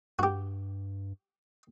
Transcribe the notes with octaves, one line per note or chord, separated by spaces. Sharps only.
G2 F#4 G4